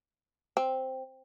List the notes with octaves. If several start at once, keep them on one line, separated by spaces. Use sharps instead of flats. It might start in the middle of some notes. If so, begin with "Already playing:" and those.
C4